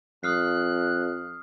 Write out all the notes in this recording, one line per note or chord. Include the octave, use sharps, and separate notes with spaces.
F2 D#6 F6 F#6 C7